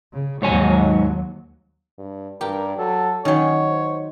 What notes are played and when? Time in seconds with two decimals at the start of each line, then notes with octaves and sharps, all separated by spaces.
0.13 C#3
0.42 D#2 G#2 F#3 C#5 G#5
1.98 G2
2.41 G2 G4 A#4
2.78 F#3 A4
3.25 D#3 F#3 C#4 C#5
3.68 C5